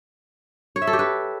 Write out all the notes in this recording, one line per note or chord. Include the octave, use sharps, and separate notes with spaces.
C#5
E5
A4
G4
B4